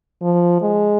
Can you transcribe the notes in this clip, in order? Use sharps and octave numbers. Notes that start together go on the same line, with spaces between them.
F3
G#3